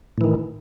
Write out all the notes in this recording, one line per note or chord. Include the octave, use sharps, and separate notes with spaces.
A2 D#3 E3